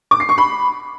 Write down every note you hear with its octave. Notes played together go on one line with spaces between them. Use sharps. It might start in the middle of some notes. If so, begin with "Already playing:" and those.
D6
C7
C#6
B5